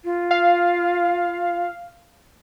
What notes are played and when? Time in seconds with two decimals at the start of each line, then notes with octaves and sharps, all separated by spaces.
0.04 F4
0.31 F5